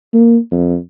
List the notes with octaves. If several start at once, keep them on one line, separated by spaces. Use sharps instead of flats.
A#3
F2